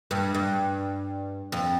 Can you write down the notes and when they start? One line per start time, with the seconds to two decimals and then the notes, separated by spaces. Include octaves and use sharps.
0.11 G2
0.34 G2
1.52 F2